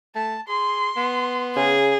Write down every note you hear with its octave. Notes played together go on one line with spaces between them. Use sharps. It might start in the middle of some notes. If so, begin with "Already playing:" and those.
A3 A5
G#4 C6
B3
C#3 G#4